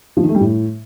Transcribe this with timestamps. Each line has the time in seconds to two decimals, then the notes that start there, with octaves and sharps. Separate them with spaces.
0.17 F3
0.23 D#3
0.29 A3
0.35 G3
0.41 A2